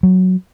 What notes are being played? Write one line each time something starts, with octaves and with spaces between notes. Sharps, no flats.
F#3